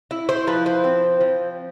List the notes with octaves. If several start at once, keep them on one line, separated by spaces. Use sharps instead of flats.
E4
C5
F3 B4
C5
C4
F3